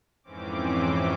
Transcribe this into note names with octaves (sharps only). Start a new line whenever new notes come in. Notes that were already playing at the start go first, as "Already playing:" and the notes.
F2 G#2 E3 C4 C#4 D6